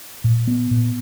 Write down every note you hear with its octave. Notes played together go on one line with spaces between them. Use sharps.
A#2
B3
A#2